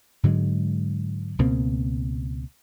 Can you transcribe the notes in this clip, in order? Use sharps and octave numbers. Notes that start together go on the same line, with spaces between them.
G#2 D3 F#3 G#3
C#2 B2 A#3 C4